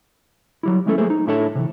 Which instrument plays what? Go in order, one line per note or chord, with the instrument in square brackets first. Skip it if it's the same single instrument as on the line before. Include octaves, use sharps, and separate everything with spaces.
[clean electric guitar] F#3 G3 E4
G#3 A3 C#4 E4 G#4 A4
F#3 A3 A#3 G#4 A4 C5
D#4
A2 D4 E4 A4 C#5 A5
C3 E3